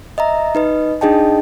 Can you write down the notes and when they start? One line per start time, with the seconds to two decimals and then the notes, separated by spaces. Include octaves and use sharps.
0.18 D#5 E5 A#5
0.55 D#4 B4 D#5
1.01 D4 D#4 G#4 D#5 G5 A5